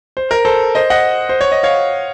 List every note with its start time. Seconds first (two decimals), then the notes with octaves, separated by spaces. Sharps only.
0.17 C5
0.31 A#4
0.45 A4 C5
0.75 C5 D#5
0.90 D#5 F#5
1.29 C5
1.41 C#5
1.52 D#5
1.63 C#5 F5